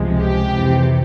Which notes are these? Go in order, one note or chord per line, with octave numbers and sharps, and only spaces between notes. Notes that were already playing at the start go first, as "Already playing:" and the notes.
Already playing: C#2 C3 F3 G#3
G4
F2 C3 E3